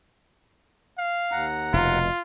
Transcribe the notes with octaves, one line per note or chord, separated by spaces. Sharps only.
F5
D#2 F#5 A#5
F1 B2 F4